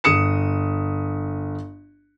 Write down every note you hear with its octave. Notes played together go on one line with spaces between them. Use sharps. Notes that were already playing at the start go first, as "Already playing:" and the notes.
G1 D#6 C#7 E7